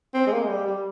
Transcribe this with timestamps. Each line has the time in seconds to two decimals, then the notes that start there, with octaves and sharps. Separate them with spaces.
0.14 C4
0.27 G#3
0.32 A#3
0.42 G#3
0.49 G3
0.67 G3